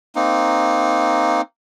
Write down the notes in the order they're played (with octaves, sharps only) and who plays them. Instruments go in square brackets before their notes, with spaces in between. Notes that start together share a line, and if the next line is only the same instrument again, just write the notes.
[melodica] A#3 C4 D#4